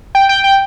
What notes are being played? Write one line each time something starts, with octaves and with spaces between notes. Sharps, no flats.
G5
G5
G5